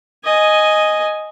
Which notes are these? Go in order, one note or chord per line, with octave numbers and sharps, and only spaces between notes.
D#5 G#5